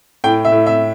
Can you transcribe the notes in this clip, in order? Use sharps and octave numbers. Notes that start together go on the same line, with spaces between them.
A2 G5
E5
A2
E5